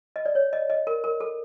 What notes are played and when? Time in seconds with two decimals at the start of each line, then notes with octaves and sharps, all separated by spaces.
0.16 D#5
0.26 D5
0.35 C#5
0.53 D#5
0.70 D#5
0.87 A#4
1.04 A#4
1.20 A4